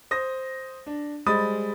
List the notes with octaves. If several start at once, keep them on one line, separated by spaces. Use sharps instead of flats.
C5 D#6 A#6
D4
G3 G#3 C5 B5 D#6 A6